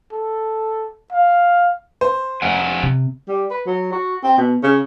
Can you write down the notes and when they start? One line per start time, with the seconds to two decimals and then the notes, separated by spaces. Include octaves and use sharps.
0.13 A4
1.12 F5
2.01 C5
2.42 F1 F3 F#5 G#5
2.83 C3
3.28 G3
3.51 B4
3.67 F#3
3.93 F#4
4.24 C4
4.38 B2
4.63 C#3